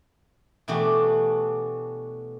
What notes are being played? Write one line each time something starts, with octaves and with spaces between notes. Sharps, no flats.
B2 E3 A3 D4 F#4 G4